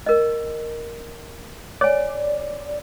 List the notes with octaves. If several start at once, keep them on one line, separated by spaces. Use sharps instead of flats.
A#4 D#5
C#5 D5 G#5